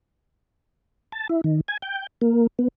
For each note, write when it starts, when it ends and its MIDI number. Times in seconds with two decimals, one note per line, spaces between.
1.12 1.27 81
1.29 1.41 64
1.44 1.60 51
1.68 1.77 80
1.82 2.07 79
2.21 2.47 58
2.59 2.68 59